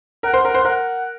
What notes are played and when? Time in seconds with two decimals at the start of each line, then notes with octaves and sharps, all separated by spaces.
0.23 A#4 F#5
0.33 C5
0.45 A#4
0.54 C5
0.64 A#4 F#5